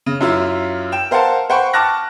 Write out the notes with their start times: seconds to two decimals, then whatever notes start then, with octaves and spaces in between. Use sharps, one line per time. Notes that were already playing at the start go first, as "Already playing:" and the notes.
0.06 C#3
0.21 F#2 E4 F4 E6
0.92 G5 E7
1.11 A#4 C5 F5 F#5 A5
1.50 C5 F#5 G5 B5 C#6
1.73 A5 C#6 D6 F6 F#6 A#6